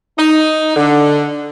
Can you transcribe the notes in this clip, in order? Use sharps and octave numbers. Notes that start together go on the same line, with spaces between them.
D#4
D3